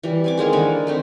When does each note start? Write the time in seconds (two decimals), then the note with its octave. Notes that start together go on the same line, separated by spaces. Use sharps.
0.03 E3 G3
0.24 C4 G#5 D6
0.38 D#3 G#3 A#3 G#5
0.53 D3 A#4 B5 C#6
0.87 A3 C4 D#4